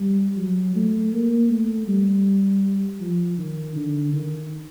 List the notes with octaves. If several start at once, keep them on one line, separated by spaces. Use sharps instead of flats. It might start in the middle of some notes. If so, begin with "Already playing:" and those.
Already playing: G3
F#3
A3
A#3
A3
G3
F3
D#3
D3
D#3